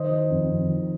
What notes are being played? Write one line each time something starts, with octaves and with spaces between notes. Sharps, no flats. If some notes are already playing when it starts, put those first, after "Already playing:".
Already playing: D#3 C5 D#5
D#3
F2
F2
D#3